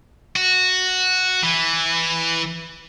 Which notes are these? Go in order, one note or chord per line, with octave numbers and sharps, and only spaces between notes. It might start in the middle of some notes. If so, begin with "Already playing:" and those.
F#4
E3